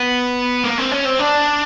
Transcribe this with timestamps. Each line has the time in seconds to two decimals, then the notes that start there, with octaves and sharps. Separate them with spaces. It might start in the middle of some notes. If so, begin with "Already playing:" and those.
Already playing: B3
0.64 A#3
0.78 C4
0.91 C#4
1.05 C4
1.19 D4